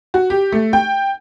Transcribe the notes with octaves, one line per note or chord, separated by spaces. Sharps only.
F#4
G4
A3
G5